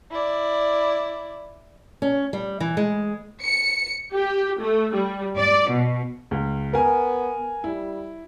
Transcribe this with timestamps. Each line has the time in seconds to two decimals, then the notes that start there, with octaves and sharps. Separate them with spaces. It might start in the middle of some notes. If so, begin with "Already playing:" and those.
0.10 E4 D5
2.02 C#4
2.33 G3
2.60 E3
2.77 G#3
3.42 C#7
4.14 G4
4.61 A3
4.95 G3
5.38 D5
5.70 B2
6.31 C#2
6.74 B3 A#4 G#5
7.64 G3 E4